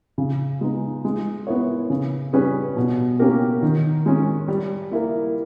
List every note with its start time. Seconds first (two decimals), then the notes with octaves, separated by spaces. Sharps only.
0.18 C#3
0.61 G#3 B3 D#4
1.05 G#3
1.47 B3 E4 A#4 C#5
1.90 C#3
2.33 G3 C#4 G#4 B4
2.77 B2
3.19 A#3 C#4 G4 A#4
3.62 D#3
4.06 G#3 C#4
4.48 G3
4.91 A#3 E4 A#4